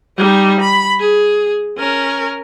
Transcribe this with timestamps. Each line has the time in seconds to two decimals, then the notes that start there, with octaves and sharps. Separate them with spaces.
0.18 G3 D#4
0.60 B5
1.00 G#4
1.78 C#4 A#4